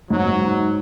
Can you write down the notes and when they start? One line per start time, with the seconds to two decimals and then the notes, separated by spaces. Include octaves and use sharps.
0.10 G#2 F#3
0.26 G#2
0.42 G#2